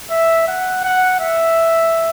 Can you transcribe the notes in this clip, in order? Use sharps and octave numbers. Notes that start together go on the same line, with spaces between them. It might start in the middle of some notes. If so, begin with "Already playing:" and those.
E5
F#5
F#5
E5